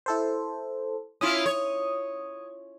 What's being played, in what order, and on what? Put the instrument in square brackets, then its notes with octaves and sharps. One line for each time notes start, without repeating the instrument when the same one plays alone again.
[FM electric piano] E4 A4 C5
[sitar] C#4 E4 F4 [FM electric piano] D#6
[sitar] C#5